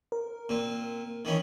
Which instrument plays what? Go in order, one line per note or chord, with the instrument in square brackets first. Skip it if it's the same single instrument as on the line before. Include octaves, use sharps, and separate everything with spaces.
[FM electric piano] A#4
[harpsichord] A#2 C4
D#3 E3 C#4